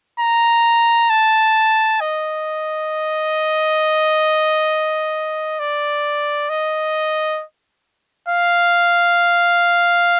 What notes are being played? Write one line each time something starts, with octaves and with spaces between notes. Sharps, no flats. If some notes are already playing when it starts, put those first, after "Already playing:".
A#5
A5
D#5
D5
D#5
F5